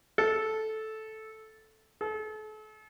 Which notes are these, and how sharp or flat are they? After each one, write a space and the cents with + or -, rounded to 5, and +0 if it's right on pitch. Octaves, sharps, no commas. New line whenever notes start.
A4 -10
A4 -40